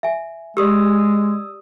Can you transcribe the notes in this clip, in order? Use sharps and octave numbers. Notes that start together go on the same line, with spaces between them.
E5 G#5
G#3 G4 D5 D#6 E6